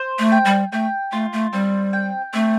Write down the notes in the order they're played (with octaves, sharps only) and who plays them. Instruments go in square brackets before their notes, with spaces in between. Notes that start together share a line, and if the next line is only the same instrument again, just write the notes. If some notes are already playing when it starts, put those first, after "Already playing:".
Already playing: [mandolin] C5
[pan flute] A3
[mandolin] G5
[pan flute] G3
[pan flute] A3 [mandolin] G5
[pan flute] A3 [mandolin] F4
[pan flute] A3
[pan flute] G3 [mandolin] C4
[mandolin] G5
[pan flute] A3 [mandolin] C4